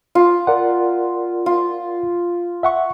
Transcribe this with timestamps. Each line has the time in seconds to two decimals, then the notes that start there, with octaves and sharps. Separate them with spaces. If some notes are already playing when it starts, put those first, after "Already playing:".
0.15 F4
0.47 A#4 D5 F#5
1.46 F4
2.63 E5 F#5 C#6